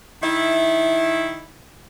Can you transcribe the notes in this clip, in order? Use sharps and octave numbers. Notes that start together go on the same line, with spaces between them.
D#3 E4